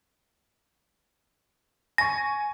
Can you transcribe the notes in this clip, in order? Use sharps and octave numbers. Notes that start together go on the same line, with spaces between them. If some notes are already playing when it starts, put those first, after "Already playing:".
G#5 C#6 A#6